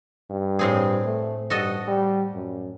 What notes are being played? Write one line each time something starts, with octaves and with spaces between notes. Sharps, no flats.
G2
A2 C4 G#4
A3
G2 F#4 A4 D#5
G3
F#2